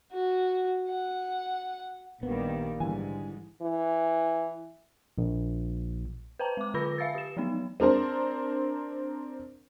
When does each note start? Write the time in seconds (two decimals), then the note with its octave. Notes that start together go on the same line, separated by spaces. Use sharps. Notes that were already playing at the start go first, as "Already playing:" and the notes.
0.12 F#4
0.89 F#5
2.23 A#1 D#3 G3 A#3 B3
2.80 G#2 D3 E3 G3 G#5
3.62 E3
5.18 A#1
6.39 B4 C5 G5 A5 A#5
6.57 G#3 D6
6.74 D3 F4 B4 B5 E6 A#6
6.98 E5 F5 E6 A6
7.15 G4 E7
7.37 F3 F#3 B3 D#4
7.80 C4 D4 A#4 C5